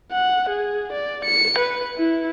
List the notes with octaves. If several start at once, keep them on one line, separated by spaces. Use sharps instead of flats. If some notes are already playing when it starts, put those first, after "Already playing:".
F#5
G#4
D5
C#7
B4
E4